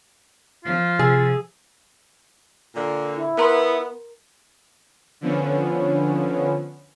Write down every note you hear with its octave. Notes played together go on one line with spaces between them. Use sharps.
F3 F4
C3 G#4 E6 A6
A#2 D3
E4
B3 A#4 A#5 C6
D3 F3 B3 C#4